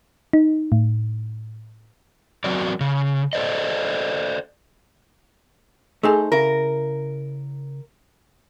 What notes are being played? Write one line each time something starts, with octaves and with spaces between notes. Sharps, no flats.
D#4
A2
F#3 C4 F#4 A#4 D5
C#3
A4 C5 D5 D#5
A3 D#4 G#4 A4 C5 G#5
C#3 E4 A#4